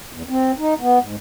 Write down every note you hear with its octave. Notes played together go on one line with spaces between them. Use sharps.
E2
C4
D#4
B3
G#2